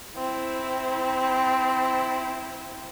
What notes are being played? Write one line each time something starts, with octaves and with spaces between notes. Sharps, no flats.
C4 E4